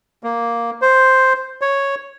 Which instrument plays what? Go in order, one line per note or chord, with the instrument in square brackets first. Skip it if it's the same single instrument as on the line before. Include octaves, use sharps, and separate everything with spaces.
[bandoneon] A#3
C5
C#5